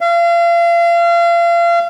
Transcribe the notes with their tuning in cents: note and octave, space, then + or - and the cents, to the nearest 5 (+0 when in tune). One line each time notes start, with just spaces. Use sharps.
F5 -35